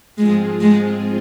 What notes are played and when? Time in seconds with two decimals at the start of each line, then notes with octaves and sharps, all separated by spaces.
0.18 G#2 F3 G#3 C4 F4 G#4
0.61 G#3